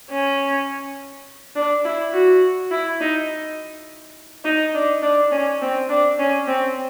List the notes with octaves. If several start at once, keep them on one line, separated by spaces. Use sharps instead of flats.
C#4
D4
E4
F#4
E4
D#4
D#4
D4
D4
C#4
C4
D4
C#4
C4